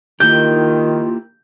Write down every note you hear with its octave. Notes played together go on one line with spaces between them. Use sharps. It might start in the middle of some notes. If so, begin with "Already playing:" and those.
D#3 A#3 E4 F4 G4 G6